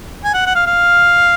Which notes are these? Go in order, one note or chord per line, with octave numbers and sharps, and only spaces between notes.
G#5
F#5
F#5
F5
F5